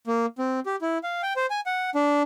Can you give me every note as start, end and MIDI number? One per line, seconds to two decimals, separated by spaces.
0.07 0.26 58
0.38 0.60 60
0.66 0.76 67
0.81 0.98 64
1.03 1.22 77
1.23 1.33 79
1.36 1.46 72
1.50 1.60 80
1.66 1.90 78
1.95 2.23 62